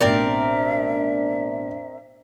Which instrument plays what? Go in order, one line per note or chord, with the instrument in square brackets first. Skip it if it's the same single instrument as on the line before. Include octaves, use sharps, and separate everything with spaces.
[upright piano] A1 B2 [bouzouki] C4 A#4 D5 [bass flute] D4 [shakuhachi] E5